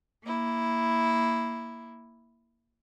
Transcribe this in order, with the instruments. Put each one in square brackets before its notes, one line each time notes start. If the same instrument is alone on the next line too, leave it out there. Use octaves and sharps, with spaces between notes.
[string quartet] A#3 E4